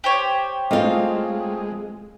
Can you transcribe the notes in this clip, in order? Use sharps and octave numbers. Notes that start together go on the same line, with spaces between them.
G4 C5 C#5
G#3 A3 C4 F4 D#5 F5